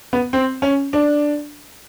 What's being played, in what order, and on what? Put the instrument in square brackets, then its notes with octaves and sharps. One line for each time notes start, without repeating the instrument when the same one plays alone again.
[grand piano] B3
C4
C#4
D4